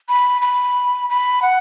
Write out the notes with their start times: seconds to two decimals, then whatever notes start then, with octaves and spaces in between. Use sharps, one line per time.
0.09 B5
0.42 B5
1.10 B5
1.42 F#5